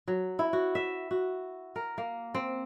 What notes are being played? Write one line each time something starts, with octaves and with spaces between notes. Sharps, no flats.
F#3
E4
F#4
E5
F#4
A#4
A#3
C4